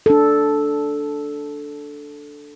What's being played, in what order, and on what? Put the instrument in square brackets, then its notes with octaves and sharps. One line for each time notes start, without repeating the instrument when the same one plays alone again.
[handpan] D4 A4